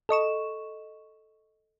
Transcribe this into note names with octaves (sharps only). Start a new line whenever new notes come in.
A4 D#5 C#6 E7